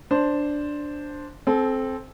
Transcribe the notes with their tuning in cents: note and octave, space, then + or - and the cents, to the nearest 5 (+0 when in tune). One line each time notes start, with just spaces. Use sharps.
D4 +0 C5 +0
C4 +0 A4 -30